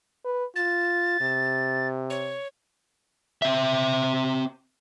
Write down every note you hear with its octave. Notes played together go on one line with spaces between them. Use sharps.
B4
F4 A6
C3
C#5
C4 E5